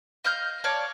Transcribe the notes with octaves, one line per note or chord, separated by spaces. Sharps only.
D#5 F5 G6
C#5 D5 F5 A5